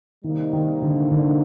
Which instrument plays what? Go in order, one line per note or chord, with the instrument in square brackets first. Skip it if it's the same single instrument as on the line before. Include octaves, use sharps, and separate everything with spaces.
[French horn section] C3 G3 A#3 D#4 [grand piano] D#3
[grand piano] D#3
D3
D3